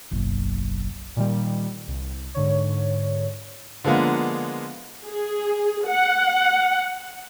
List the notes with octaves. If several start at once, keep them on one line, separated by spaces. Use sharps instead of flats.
F#1 B1
A#2 D#3 G3
C2
G#2 D3 C#5
D3 F3 G#3 A#3 B3
G#4
F#5